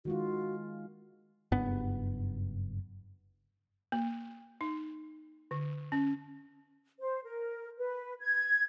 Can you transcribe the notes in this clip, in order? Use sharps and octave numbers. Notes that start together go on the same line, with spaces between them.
D#3 G#3 F4 F#4
F#1 G2 B3
A#3
D#4
D3
C#4
C5
A#4
B4
G#6